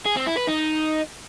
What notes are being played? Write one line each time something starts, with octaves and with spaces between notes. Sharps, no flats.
G#4
C4
E4
B4
D#4